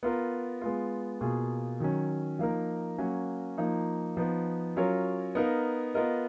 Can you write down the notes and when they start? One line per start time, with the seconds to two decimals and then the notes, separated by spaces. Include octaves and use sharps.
0.03 B3 F4 A#4
0.62 G#3 B3 F4
1.21 B2 A#3 F4 G#4
1.80 D#3 F#3 C#4
2.39 F3 A#3 D#4 A#4
2.98 F#3 A#3 C#4 F#4
3.58 F3 A#3 D#4
4.17 F3 B3 D#4
4.76 F#3 C#4 F4 A#4 C#5
5.35 B3 D#4 A#4 F5
5.94 B3 F4 A#4 D#5